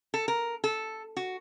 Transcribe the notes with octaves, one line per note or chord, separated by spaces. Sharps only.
A4
A#4
A4
F#4